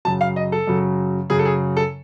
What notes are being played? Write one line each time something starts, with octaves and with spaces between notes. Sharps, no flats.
F#2 C#3 F#3 A5
F5
D#5
A4
F#2 C#3 F#3
F#2 C#3 F#3 G#4
A4
G#4
A4